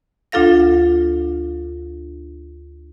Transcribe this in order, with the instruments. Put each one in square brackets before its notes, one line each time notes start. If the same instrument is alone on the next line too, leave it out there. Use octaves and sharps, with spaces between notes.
[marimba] D2 D4 F4 A4 F5 A#6